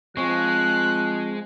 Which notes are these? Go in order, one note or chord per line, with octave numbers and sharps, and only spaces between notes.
F3 G#3 C4 C#5 F#6